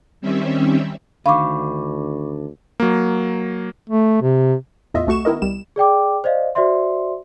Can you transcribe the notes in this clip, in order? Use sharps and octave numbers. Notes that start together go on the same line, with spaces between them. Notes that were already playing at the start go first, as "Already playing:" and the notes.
D#3 G3 C4 C#4 E5
D2 D3 D#3 F5 B5 C#6 D6
F#3 A#3
A3
C3
E2 A2 F4 D#5 E5
C2 A3 F#4 C#6 E7
D#3 B3 E4 A#4 D#5
C2 G3 E7
G#4 D5 G5 D6
C5 D5 D#5 F5
F#4 C5 D5 E5 C6